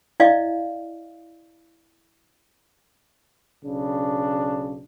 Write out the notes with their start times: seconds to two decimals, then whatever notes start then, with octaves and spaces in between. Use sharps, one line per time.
0.20 E4 D5 D#5 F5
3.64 B1 C#3 D4